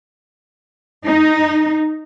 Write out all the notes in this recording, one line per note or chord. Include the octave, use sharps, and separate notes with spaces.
D#4